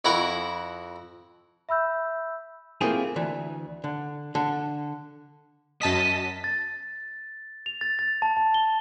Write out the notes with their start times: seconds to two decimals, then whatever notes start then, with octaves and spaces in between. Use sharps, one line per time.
0.05 F2 E4 A#4 F#5 C#6
1.69 E5 B5 E6 G6
2.81 A3 A#3 C4 E4 F4 G#4
3.16 D2 E3
3.84 D3
4.35 D3 A4
5.82 F#2 D#5 A5 B6
6.44 A6
7.66 F7
7.81 A6
7.99 A6
8.22 A5
8.37 A5
8.54 G7